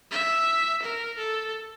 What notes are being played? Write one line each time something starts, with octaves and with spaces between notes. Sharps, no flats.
E5
A#4
A4